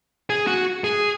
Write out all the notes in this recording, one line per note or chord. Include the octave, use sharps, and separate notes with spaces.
G#4
F#4
G#4